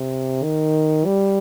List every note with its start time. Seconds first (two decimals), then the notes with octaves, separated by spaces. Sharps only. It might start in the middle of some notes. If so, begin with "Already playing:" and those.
Already playing: C3
0.43 D#3
1.05 G3